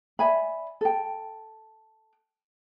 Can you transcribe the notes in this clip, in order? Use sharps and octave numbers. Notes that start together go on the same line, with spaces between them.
D5 E5 G#5 B5
A4 G5